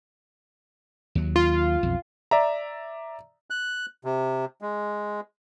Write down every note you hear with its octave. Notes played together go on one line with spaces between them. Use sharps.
D#2 F#3
F4
B1 F2
D5 E5 A#5
F#6
C3
G#3